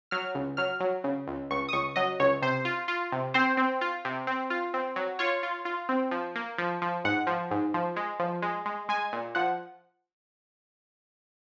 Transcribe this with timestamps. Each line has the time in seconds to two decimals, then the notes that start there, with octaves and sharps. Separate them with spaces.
0.11 F#3 F6
0.35 C#2
0.57 F#3 F6
0.80 F#3
1.04 C#3
1.28 C#2
1.51 C#2 C#6
1.69 D#6
1.73 C#2 C#6
1.96 F#3 D#5
2.20 C#2 C#5
2.42 C3 C5
2.65 F4
2.88 F4
3.12 C3
3.34 C4 C5
3.57 C4
3.81 F4
4.05 C3
4.27 C4
4.50 F4
4.74 C4
4.96 F#3
5.19 F4 C#5
5.43 F4
5.65 F4
5.89 C4
6.11 F3
6.35 A#3
6.58 F3
6.82 F3
7.04 G#2 F#5
7.27 F3
7.51 G#2
7.74 F3
7.96 G#3
8.19 F3
8.42 G#3
8.66 G#3
8.89 G#3 G#5
9.13 A#2
9.35 F3 F#5